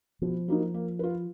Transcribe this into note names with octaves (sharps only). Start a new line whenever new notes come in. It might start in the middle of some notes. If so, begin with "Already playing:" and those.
B2 F3
F#3 A#3 D#4
A#3
F4 B4